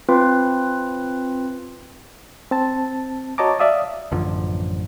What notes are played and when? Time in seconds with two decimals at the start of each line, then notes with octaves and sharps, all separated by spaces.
0.09 C4 F4 B4
2.51 C4 A5
3.38 F#4 C#5 D#5 A5 A#5 D6
3.59 D5 E5 F5 D#6
4.12 A1 F#2 D3 F3